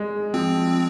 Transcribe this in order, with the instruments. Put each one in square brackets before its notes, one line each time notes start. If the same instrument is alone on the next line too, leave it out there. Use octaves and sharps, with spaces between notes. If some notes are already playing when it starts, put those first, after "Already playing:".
Already playing: [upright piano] G#3
[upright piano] F3 [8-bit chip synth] C4